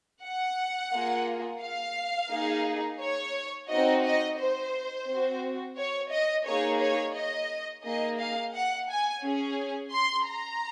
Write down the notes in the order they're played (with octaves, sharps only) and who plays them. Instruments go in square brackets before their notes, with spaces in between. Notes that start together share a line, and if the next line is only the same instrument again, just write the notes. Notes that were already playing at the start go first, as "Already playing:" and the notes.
[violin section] F#5
A#3 F4 G#4
F5
A#3 D#4 G#4
C#5
C4 D#4 F#4 D#5
D#5
C5
C4 F#4
C#5
D#5
A#3 D#4 G#4 C#5
C#5
D#5
A#3 D#4 G#4 D#5
F5
F#5
G#5
C#4 G#4
C6
A#5